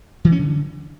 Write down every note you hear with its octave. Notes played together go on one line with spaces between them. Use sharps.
E3
C#4
D3